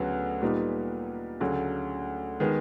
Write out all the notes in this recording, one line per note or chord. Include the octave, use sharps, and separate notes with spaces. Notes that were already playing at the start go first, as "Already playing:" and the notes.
Already playing: D2 C#3 F#3 B3
A#2 G3 B3 D#4
D2 C#3 F#3
D#3 G#3 B3